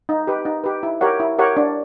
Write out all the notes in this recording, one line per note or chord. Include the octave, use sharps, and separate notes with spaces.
D#4
G4 B4
D#4
G4 B4
E4
G4 A#4 C#5 F#5
E4
G4 A#4 C#5 F#5
D4